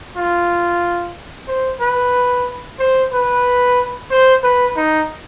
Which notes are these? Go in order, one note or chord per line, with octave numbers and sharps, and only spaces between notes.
F4
C5
B4
C5
B4
C5
B4
D#4